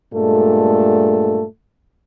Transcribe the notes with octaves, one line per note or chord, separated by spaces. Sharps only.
G2 A#2 G#3 A3 A4